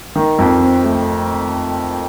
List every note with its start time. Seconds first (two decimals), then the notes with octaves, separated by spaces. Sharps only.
0.16 D#3
0.39 F2
0.61 C4
0.83 A3